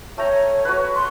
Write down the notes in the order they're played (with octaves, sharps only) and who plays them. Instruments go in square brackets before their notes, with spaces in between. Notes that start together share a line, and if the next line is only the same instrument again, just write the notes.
[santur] A3 G5 A#5 [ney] C#5
[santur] F#4 B4
[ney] C6